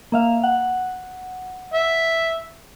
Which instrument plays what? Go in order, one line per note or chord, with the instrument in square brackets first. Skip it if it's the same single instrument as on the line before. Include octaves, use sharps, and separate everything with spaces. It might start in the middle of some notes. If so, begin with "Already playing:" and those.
[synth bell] A#3 E5 F5
F#5
[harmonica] E5